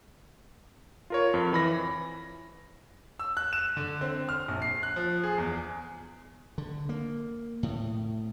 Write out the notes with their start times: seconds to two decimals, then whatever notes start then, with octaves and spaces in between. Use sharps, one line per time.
1.10 F4 A#4 C#5
1.34 F2
1.53 E3 B5 A#6
3.19 E6
3.37 F#6
3.53 E7
3.77 D3
4.01 C4
4.29 F6
4.48 A#1
4.62 C7
4.83 F#6
4.96 F3
5.23 G#4
5.38 E2
6.58 D3
6.89 A#3
7.63 A2